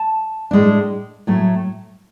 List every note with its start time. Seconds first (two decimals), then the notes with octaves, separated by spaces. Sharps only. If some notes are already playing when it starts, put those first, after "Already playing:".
Already playing: A5
0.51 A2 G#3 D4
1.27 A2 F#3 A3